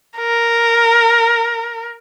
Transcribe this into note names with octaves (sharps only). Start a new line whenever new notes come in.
A#4